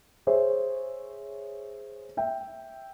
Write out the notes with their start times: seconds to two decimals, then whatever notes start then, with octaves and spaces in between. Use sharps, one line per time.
0.27 G#4 C5 C#5 E5
2.17 E5 G5